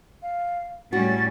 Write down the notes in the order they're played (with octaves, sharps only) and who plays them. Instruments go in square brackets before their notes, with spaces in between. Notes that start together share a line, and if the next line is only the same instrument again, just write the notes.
[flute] F5
[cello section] A2 G3 C#4 [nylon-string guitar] F#4 [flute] A6